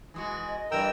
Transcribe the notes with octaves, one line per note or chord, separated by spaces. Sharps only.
E3 G#3 F#4
D#5
G2 E3 A#4 G5 E6